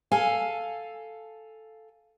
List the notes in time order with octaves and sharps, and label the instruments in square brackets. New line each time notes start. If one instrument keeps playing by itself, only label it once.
[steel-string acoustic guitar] A4 F5 G#5